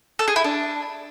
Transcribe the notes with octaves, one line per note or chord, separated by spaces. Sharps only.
A4
G#4
E4
D4